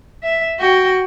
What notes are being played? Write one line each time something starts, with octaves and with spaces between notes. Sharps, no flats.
E5
F#4 G5